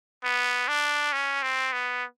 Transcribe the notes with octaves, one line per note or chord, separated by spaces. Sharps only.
B3
D4
C#4
C4
B3